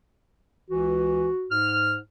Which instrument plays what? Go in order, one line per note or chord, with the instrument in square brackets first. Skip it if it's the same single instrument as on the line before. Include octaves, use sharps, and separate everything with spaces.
[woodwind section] C#2 E3 [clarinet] F#4
[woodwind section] G#2 F6